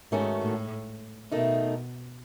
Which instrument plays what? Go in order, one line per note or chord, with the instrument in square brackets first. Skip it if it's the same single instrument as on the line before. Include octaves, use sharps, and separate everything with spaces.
[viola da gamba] G#2 [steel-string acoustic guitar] D#3 A3 C#4 F#4 A4
[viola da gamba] A2
[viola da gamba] B2 [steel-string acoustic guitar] D#3 A3 D#4